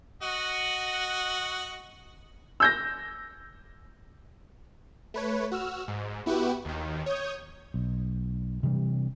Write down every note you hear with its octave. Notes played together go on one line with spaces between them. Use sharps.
F#4 D#5 F#5
E6 G6 A#6
A3 B4 C#5
F#4 E6 F6
G#2
B3 E4 F#4 G4 B4
D#2 D#3
C#5 D#6 G6 G#6
B1
C3 E3 G3 D4